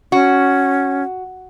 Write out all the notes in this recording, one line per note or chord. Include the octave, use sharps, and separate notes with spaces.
C#4 F#4